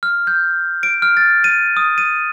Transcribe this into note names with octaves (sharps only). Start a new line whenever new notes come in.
F6
G6
D7
F6
A6
D#7
D#6
D#7